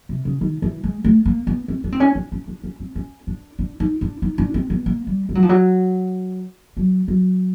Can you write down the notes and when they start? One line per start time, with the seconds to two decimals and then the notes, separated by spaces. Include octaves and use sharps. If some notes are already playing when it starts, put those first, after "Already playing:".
0.09 C3
0.25 C#3
0.41 D#3
0.62 E3
0.83 G#3
1.04 A3
1.26 A#3
1.47 B3
1.68 C4
1.84 D4
1.92 C4
2.00 C#4
2.15 D4
2.32 C#4
2.48 D4
2.64 C#4
2.80 C4
2.95 C#4
3.27 D4
3.59 D4
3.80 D#4
4.01 D4
4.22 D#4
4.38 D4
4.54 C4
4.70 B3
4.86 A#3
5.07 G3
5.29 G3
5.35 F#3
5.43 F3
5.49 F#3
6.77 F#3
7.08 F#3